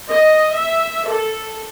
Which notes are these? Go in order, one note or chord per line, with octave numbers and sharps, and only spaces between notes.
D#5
E5
A4